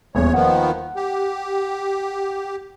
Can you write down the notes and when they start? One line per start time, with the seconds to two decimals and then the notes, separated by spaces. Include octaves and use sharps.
0.15 D#1 E2 C#5
0.34 D#3 F3 B3 F#5
0.96 G4